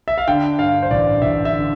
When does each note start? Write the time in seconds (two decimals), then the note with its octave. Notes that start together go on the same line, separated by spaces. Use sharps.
0.08 E5
0.18 F5
0.28 D3 G5
0.59 G2 F5
0.83 C5
0.90 A1 D5
1.22 A1 E5
1.45 E5
1.53 D3